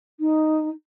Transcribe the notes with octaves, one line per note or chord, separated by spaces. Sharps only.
D#4